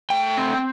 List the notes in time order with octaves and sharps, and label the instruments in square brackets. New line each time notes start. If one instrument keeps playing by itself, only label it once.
[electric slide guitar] A3 G5
C4